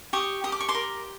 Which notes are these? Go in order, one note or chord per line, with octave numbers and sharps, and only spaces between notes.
G4 C#6 D#6
G4 D#6
D6
C#6
C6 D6
A#4